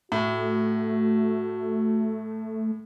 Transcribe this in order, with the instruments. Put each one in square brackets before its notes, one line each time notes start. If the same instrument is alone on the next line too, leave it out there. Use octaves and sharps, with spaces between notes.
[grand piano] A2 [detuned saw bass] A3 [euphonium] F#4